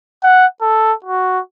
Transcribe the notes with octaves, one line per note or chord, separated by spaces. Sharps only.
F#5
A4
F#4